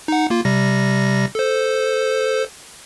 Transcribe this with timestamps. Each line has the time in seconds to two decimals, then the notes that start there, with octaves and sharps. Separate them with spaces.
0.08 D#4 F#5
0.30 A#3 F4
0.45 C3 G3 A#6
1.35 A4 C5